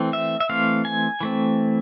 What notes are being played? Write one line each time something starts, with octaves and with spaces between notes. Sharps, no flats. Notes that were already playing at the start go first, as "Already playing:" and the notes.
Already playing: E3 A3 C4
E5
E5
E3 A3 C4 F5
G#5
E3 A3 C4